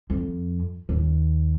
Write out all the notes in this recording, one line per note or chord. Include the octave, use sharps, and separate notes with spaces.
F2
D#2